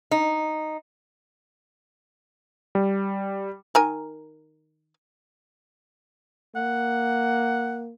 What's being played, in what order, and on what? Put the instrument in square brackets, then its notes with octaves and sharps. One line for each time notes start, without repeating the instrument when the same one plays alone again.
[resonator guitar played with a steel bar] D#4
[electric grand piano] G3
[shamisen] D#3 A#4 G#5
[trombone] A#3 [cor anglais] F#5